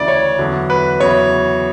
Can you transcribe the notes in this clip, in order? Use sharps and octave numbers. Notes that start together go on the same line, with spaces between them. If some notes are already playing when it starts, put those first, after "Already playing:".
Already playing: D2 C#3 E3 D5
C#5
E2 D3 F#3
B4
E2 C#3 F#3 C#5